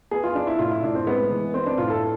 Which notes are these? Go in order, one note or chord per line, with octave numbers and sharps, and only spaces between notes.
B3 G#4
F4
F3 D4
E4
A2 F4
E4
A2 D4
C4
G#3 B3
E3
B3 C4
D4
A2 F4
A4